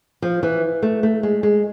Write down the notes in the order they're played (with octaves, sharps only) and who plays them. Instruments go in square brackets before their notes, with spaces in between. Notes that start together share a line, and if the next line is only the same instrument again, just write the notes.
[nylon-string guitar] F3
E3
A3
A3
G#3
G#3